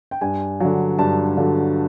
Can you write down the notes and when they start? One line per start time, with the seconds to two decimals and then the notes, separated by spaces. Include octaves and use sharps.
0.11 G5
0.21 G2 G#5
0.60 D3 F#3
0.99 G2 A5
1.37 D3 F#3